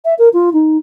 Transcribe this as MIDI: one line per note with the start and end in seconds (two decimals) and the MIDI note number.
0.04 0.14 76
0.18 0.28 70
0.33 0.49 65
0.53 0.77 63